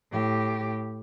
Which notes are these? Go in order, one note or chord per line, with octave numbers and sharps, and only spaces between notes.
A2 G4